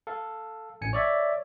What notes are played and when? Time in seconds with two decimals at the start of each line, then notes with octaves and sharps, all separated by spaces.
0.07 A4 F5
0.81 A1 G#5 C#7
0.93 C#5 D5 E5